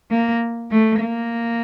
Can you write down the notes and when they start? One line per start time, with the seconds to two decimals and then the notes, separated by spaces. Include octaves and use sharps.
0.11 A#3
0.71 A3
1.00 A#3